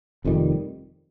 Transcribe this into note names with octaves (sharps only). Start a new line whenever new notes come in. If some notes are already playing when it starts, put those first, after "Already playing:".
F1 F2 D#3 G3